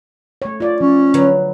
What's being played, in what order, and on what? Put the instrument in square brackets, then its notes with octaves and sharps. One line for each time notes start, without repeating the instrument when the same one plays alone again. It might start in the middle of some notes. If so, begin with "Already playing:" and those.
[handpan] A3 C#5
F4 D5
[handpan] F3 [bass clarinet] C#4
[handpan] D3 B4 [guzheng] F#3